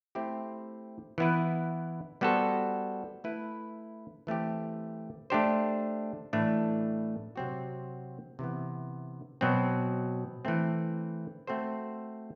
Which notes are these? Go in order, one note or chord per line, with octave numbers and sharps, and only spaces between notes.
A3 C4 E4 G4 C5
E3 B3 E4 B4
G3 B3 F#4 A4 C5
A3 E4 B4
E3 A3 C4 G4
A3 D4 G4 C5
A2 E3 A3 D4
C3 F#3 C4 F#4
C3 E3 B3
B2 F#3 C4
E3 A3 C4
A3 C4 F#4 A4 C5